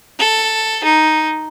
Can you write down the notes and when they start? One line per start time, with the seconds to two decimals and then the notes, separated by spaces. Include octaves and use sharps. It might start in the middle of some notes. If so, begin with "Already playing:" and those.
0.19 A4
0.84 D#4